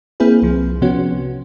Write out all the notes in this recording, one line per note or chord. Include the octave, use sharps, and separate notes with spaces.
A#3 C4 E4 G#4 B4
C2 F3
C3 F3 B3 C#4 F#4